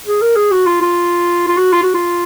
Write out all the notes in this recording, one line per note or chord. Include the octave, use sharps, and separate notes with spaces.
G#4
A#4
G#4
F#4
F4
F4
F4
F#4
F4
F#4
F4